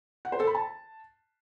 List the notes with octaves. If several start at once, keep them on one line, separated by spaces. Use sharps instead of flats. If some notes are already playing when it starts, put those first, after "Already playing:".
F#5
C5
A4
B5
A5